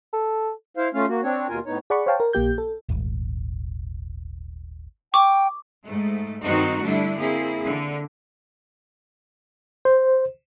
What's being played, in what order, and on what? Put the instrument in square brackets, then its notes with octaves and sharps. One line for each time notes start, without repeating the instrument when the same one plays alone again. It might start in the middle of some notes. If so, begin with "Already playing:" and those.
[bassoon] A4
[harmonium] E4 C5 F5
A3 C#4 F4 F5
A#3 F#4
C4 D4 C#5
D#2 B2 F4 A#4 G#5
A2 B3 D#4 C#5
[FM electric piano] G#4 D5 F#5 B5 C#6
C5 C#5 F5 G5 A5
A#4
A#1 A#3 G4 G6
A4
[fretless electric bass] D#1 G#1
[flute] G5 [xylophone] C#6 D6
[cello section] G#2 A3
G2 D#3 C4 D#4 F#4
D3 G3 A3 D4 E4
A#3 C4 E4 G#4
D3
[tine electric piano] C5